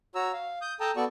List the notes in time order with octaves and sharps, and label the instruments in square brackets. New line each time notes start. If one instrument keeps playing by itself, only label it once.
[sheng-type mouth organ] F#4 C#5 A#5 E6
F5
D#6 G6
A4 G5 A5 A#5 D#6
B3 F#4 A4 D5 C#6